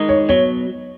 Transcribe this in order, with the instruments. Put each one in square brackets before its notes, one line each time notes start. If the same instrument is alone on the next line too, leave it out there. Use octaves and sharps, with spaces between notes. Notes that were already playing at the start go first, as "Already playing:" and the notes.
Already playing: [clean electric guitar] D#3 G#3 D#4 G#4
[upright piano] C#5
[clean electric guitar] B2 F#3 [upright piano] C#5